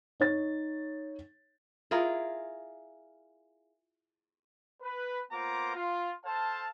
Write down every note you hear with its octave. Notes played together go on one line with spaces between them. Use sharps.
D#4 C#5 A6
E4 F4 G#4 A#4
B4
A#3 B3 F4 C5 A#5 D6
F4
A4 C5 F5 A5